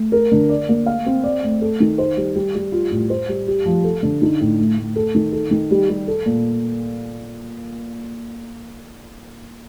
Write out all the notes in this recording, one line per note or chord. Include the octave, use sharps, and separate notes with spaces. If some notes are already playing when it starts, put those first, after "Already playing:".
Already playing: A3
A#4
D3
D5
A#3
F5
C4
D5
A3
A4
D#3
C5
G3
G3
G3
F4
A2
C5
G3
G4
F3
A4
D3
D#4
A2
A3
A3
A4
D#3
A4
D#3
G3
G3
A4
A#2